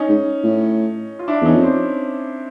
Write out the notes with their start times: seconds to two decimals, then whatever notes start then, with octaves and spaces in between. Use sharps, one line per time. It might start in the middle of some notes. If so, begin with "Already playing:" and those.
Already playing: C#4 D#4
0.08 G#2
0.43 A2
1.19 F4
1.28 D4 E4
1.41 E2 C#4 D#4
1.55 F2
1.62 C4 D4